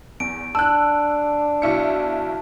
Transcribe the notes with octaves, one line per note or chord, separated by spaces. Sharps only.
E2 D7
D4 A5 E6 F#6
B1 E4 C#7